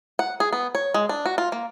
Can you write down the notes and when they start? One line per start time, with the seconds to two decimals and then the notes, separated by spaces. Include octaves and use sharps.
0.19 F#5
0.40 G#4
0.53 B3
0.75 C#5
0.94 G#3
1.09 D4
1.26 F#4
1.38 F4
1.52 A#3